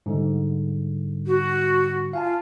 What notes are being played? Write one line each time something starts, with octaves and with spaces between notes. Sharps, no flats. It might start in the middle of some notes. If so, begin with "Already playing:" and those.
G#2 D3 G3
F#4
F4 F5 G#5 A5